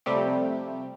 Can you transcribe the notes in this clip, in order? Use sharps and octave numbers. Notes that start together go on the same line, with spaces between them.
C3 F3 G3 A3 C4 G4